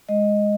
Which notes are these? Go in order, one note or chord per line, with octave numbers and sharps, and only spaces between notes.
G#3 D#5